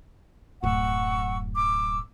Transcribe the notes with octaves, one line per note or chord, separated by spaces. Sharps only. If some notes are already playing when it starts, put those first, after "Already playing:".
D1 F#2 F#5 C#6 E6
D6 E6